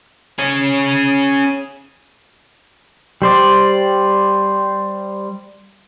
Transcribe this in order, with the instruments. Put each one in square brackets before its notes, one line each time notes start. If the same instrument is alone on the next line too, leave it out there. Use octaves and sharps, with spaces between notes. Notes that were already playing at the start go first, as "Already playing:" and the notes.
[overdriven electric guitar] C#4 G#4
[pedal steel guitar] G3 C5 D5